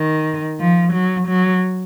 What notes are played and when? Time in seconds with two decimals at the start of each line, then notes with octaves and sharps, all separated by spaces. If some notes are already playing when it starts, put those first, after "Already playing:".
Already playing: D#3
0.60 F3
0.93 F#3
1.28 F#3